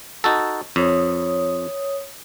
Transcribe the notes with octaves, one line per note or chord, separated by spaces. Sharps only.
D#4 F#4 A4
F2 C#5 D#6